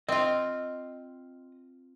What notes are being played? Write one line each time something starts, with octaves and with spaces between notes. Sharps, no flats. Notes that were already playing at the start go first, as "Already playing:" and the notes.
C4 F4 D#5